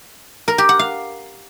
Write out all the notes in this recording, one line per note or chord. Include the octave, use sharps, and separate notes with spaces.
A#4
G4
F#5
F5